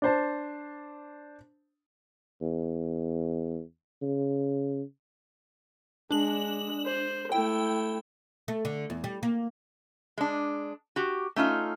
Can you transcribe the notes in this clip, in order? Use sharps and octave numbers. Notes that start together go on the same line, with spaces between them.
D4 C5 A5
E2
C#3
G#3 D4 F#7
C5
A3 E4 G5
A3
D3
E2
G3
A#3
G#3 D4
F#4 G4
A3 C#4 D#4 F4